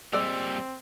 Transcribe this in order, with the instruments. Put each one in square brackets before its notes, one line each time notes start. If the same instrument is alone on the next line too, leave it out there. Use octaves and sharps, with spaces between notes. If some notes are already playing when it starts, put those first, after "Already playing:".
[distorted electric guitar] A#2 G3 [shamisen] G#3 D5 [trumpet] C4 [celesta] E6